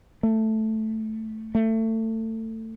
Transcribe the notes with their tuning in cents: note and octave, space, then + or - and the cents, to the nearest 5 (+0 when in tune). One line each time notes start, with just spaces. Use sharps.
A3 +0
A3 +25